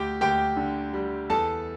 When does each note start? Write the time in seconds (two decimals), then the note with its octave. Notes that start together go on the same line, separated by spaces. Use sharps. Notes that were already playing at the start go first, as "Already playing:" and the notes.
Already playing: D2 G4 G5
0.21 D2 G4 G5
0.57 D3
0.93 G3
1.30 E2 A4 A5